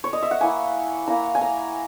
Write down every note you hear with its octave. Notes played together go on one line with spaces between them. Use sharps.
C#5
D#5
E5
F#5
A#3 E4 G#5
A#3 E4 A#5
G#5
A#5